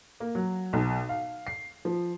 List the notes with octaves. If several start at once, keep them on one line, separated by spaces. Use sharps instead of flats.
A#3
F#3
B1
F5
C7
F3